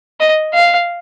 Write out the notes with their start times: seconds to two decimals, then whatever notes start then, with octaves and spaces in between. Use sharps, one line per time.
0.20 D#5
0.54 F5